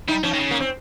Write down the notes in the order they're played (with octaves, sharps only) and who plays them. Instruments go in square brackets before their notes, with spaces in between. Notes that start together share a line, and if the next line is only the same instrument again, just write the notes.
[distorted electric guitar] G3 [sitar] D#4
[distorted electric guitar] F3 [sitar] C#4
[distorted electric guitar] D#3
C#3
[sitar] A#3
C4